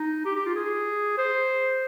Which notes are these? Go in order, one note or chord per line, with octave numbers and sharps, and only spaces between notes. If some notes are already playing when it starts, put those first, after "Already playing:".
Already playing: D#4
G4
G4
F4
G#4
C5